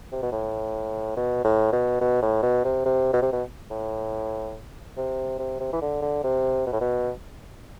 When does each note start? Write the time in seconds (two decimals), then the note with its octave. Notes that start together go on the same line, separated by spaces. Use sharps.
0.12 C3
0.22 B2
0.32 A2
1.17 B2
1.44 A2
1.72 B2
2.01 B2
2.22 A2
2.43 B2
2.64 C3
2.85 C3
3.13 B2
3.22 C3
3.32 B2
3.70 A2
4.97 C3
5.39 C3
5.60 C3
5.73 E3
5.82 D3
6.02 D3
6.24 C3
6.66 B2
6.73 A2
6.81 B2